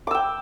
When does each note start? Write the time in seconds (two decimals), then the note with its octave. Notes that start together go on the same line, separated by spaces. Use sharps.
0.07 D6
0.11 E6
0.15 G5